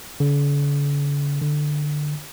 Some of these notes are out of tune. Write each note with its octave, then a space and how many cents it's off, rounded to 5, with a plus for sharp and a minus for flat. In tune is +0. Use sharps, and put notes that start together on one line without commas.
D3 -45
D3 +15